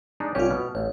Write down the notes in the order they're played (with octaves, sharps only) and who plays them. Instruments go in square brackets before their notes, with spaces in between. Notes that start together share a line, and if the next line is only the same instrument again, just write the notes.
[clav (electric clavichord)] G#3 D4 D#4
[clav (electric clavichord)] C2 C#4 G4 [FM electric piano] F4 C#5
[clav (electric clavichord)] B2 [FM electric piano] F6
[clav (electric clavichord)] A1 [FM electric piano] C#5